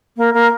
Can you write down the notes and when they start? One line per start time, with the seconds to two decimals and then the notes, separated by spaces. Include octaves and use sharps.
0.17 A#3
0.34 A#3